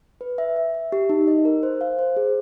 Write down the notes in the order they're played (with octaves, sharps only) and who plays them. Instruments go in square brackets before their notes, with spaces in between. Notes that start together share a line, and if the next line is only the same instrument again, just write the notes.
[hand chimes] B4
E5
E5
E5
G4
D#4
D#5
A#4
C5
F5
C5
G#4